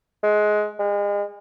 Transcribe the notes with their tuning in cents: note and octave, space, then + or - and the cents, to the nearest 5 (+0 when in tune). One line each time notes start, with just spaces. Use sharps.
G#3 +20
G#3 -35